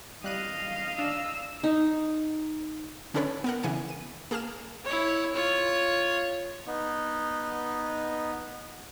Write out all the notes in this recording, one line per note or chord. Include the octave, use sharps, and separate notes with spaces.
G3 D#5 F5 F#6 D#7
D4 E6
D#4
D3 C#4 D4 A4 B4 C#5
B3 A#4 F#5
C#3 E3 D4 G#5 C#7
D#7
A#3 G#4 A5 F6 E7
E4 C#5
F4 C#5
B3 D#4